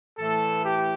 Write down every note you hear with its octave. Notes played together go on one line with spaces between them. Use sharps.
A2 E3 A4
G4